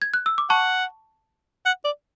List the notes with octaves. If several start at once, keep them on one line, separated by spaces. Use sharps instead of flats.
G#6
F#6
E6
D6
F#5 A5 C#6
F#5
D5